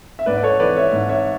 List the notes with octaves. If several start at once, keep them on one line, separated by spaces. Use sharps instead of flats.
E5
G#2 B4 D5
D5
A4 C#5
E3 B4 D5
C#5 E5
G#2
C#5 E5